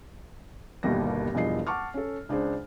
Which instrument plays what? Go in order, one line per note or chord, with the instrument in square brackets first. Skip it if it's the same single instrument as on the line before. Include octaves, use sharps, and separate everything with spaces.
[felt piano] G1 D#2 B2 G3 A#3 A#6
E1 E2 G2 F3 D#5 C7
F#5 A5 C#6 D6 F6
C#4 A4
C#2 D4 G#4 C5